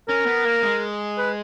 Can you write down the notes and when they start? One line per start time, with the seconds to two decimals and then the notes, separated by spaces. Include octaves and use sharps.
0.08 C#4 A#4
0.26 B3
0.45 A#3
0.63 G#3
1.18 B4